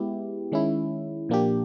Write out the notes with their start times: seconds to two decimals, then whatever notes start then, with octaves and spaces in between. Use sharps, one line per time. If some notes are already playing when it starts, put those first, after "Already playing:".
Already playing: G#3 B3 E4 G4
0.52 D#3 G#3 C#4 E4
1.29 A#2 F3 A#3 D4 G4